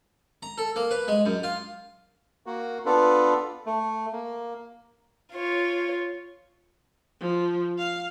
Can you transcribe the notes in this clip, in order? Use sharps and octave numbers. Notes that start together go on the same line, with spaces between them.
A#5
A4
A#3
B4
G#3
F#2
F4
A#3 F#4
B3 D4 F4 A4 B4
A3
A#3
F4 C#5
F3
F5